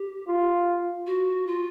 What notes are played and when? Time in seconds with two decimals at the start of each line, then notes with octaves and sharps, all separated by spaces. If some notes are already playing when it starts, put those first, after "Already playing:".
Already playing: G4
0.28 F4
1.07 F#4
1.47 F4